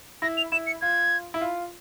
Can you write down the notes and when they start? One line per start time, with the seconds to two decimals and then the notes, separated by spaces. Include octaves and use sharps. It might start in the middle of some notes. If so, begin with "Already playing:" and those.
0.22 E4 A#6
0.37 F7
0.52 E4 E7
0.67 C#7
0.81 F4 G#6
1.34 E4
1.41 F4